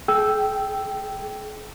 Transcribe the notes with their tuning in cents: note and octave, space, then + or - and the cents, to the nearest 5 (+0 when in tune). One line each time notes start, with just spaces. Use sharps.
G#4 +40 G5 -5 E6 +0